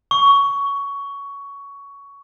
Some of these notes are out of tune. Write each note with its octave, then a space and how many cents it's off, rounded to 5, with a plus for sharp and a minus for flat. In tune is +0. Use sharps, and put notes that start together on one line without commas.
C#6 +15